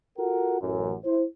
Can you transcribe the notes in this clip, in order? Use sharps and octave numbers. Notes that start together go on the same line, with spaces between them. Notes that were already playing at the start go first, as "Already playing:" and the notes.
F4 F#4 A4 A#4 F#5
A1 F#2
E4 C5